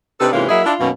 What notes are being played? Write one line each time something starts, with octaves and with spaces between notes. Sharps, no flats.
C3 D4 D#4 A4 B4
G#2 C3 E3 A#3 C#4 F4
F#3 A#3 E4 G#4 D#5 E5
D4 E4 F4
F#2 B2 D#3 A#3 B3 C#4